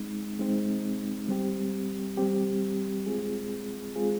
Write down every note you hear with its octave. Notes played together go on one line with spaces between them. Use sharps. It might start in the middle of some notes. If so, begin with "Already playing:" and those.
Already playing: G#3 C4 D#4
G#3 C4 D#4
G3 C4 G4
G3 C4 G4
G#3 C4 F4 G#4
G#3 C4 F4 G#4